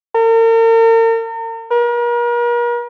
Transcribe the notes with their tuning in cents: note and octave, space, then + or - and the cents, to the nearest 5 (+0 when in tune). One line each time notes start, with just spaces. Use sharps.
A#4 -40
A#4 +40